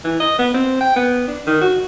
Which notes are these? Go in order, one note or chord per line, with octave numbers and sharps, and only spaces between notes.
E3
D#5
B3
C4
G5
B3
D4
D#3
F#4